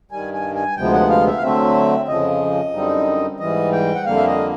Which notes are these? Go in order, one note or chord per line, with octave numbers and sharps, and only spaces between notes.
G2 D#3 G3 G#5
G#5
G#5
D2 C3 F3 G#3 B3 G5
F#5
F5
E5
F5
D3 F#3 A3 C4 E5
F2 C#3 F3 D#5
F#2 D3 G3 C4 D#4
G#2 E3 G3 D#5
G5
F#5
F2 D3 G3 A#3 F5
E5
D#5